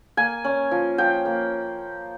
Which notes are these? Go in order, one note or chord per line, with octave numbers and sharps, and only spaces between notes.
A#3 G#5
C#4
F3
F3 G5
A#3